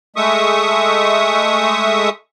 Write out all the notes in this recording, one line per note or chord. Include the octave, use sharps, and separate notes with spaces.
G#3 A3 E5 C#6 D#6